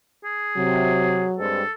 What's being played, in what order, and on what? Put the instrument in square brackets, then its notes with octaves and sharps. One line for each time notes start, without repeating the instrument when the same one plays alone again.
[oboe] G#4
[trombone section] C3 [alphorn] F#3
[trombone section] G2 G#3 C4 [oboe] A4